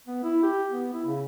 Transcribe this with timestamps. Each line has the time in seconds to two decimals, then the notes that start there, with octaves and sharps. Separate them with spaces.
0.07 B3
0.23 E4
0.43 G4
0.70 B3
0.93 E4
1.06 C#3